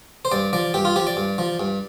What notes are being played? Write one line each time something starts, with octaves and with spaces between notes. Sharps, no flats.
C5
G2 D5
F3 D5
G2 G4
F4
F3 G4
D5
G2
F3
G2